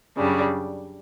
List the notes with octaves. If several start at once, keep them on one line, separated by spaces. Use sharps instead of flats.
F#2 C#3 G3 D4